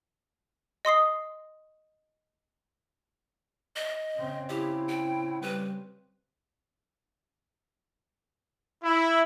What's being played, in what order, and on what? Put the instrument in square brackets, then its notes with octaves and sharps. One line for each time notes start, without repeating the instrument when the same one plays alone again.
[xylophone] D#5 C6 D#6 C7
[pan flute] D#5
[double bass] C#3 C4
[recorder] E4 [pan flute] G4
[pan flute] G5
[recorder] G3 [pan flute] B4
[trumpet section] E4